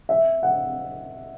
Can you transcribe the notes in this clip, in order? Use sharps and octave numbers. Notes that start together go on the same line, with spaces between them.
E5
F#5